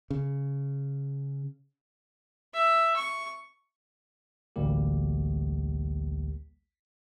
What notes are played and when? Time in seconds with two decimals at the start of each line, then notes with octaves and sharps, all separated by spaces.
0.10 C#3
2.54 E5
2.96 C#6
4.56 A1 D2 G3 A#3 G4